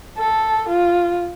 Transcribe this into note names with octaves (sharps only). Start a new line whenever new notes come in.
A4
F4